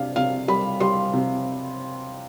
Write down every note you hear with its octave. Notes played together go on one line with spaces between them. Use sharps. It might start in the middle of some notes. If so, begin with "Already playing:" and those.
Already playing: C3 D4 F5
C3 F5
G3 B5
G3 C6
C3